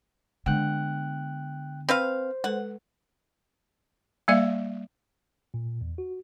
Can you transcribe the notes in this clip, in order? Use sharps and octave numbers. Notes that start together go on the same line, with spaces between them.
D3 G#3 B3 G5 F#6
C4 B4 C5 F5
G#3 A4 B4 F#5
G3 A#3 D5 E5 F5
A#2
E2
F#4